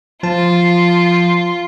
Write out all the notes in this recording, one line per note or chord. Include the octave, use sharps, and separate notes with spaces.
F3 F4 A5